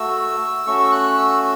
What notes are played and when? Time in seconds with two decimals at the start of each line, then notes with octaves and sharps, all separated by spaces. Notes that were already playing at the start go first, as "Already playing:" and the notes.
Already playing: A3 F#4 E6
0.66 A3 C#4 F#4 C#6
0.80 E6
0.92 F#6
1.18 E6